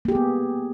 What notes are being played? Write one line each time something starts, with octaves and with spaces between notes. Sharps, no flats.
A#3 B3 G4 G#4